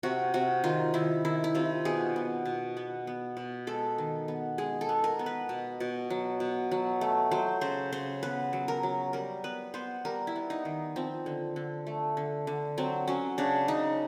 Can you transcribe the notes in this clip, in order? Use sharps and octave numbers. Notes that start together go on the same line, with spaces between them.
C3 F#4
C3 F#4
D#3 F4
D#3 E4
D#3 E4
E4
C3 F4
B2 G#4
B3
B2
B3
B3
B2
G#3 A4
D#3
B3
G#3 G#4
A4
B3
A#4
B3
B4
B2
B2
F#3
B2
F#3
A3
F#3 C5
C#3 C5
C#3 C5
B3 B4
F#3
A#4
F#3
G3 A#4
B3 B4
B3 C5
G3 A#4
E4
B3
D#4
D#3
F3 C4
D3
D3
A3
D3
D3
F#3 C4
F#3 C#4
C#3 D4
C#3 D#4